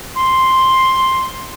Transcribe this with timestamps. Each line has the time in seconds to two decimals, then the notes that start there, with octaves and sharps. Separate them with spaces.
0.16 C6